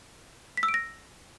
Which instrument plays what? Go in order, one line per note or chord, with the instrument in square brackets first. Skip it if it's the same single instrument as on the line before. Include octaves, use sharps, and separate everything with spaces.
[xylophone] B6
E6
D7
A#6